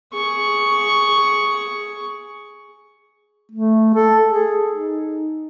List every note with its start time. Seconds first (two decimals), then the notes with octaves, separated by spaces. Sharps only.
0.14 G#4 C#6
3.52 A3
3.95 A4
4.27 G#4
4.72 D#4